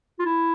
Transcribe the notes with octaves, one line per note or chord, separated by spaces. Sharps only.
F4
E4